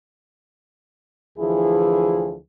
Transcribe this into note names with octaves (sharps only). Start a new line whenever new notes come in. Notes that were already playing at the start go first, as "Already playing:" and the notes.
D2 E3 F3 E4 G#4